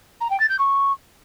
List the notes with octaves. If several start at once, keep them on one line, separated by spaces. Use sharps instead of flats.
A#5
G5
A6
G6
C#6